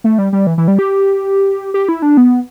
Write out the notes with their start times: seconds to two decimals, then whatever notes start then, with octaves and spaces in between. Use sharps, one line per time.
0.04 A3
0.18 G3
0.33 G3
0.47 E3
0.58 E3
0.68 G3
0.79 G4
1.74 G4
1.89 E4
2.02 D4
2.17 B3